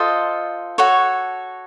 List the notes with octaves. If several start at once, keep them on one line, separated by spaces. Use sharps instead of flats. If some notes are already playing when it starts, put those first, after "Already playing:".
Already playing: F4 A4 C5 D#5 A5
F#4 A4 C#5